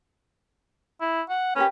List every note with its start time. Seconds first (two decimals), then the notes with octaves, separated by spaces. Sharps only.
1.01 E4
1.30 F#5
1.56 C#4 G4 A#4 B4